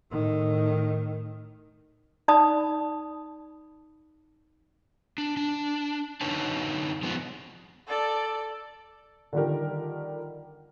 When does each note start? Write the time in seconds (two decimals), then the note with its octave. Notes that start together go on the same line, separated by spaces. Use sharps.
0.11 A2 D#3
2.28 D#4 D5 A5 B5 D#6
5.18 D4
5.37 D4
6.21 F#2 D3 D#4 B4 C#5 A5
7.03 F3 G#3 B3
7.88 A4 D5
9.33 D3 D#3 F3 G3 G4 A#4